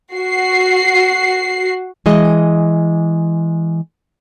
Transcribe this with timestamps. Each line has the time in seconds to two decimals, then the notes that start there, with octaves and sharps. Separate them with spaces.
0.14 F#4 C7
2.06 E3 G#3 D#5